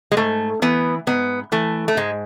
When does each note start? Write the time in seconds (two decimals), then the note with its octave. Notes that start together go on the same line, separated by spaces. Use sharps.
0.12 G#3
0.17 G#2 A3
0.62 E3 B3
1.07 G#2 B3
1.52 E3 A3
1.88 A3
1.97 G#2 G#3